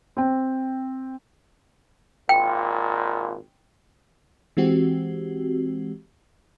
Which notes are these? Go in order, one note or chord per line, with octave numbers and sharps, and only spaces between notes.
C4 G5
G#1 A#2 G5
E3 G#3 C4 F#4 G4